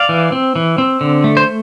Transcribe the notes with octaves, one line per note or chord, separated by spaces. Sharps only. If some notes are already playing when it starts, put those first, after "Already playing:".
Already playing: D5 F5
E3
C4
E3
C4
D3
A3
C5